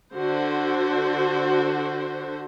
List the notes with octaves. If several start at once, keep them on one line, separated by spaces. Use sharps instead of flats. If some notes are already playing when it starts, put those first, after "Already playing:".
D3 F#4 C5